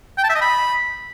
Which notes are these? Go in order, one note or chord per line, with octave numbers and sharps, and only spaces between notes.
G5
A5
E5
D#5
B5